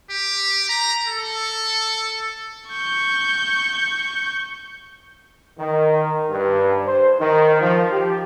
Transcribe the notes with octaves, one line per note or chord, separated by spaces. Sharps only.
G4
A#5
A4
C#6 G6
D#3
G2
C5
D#3
F3
G4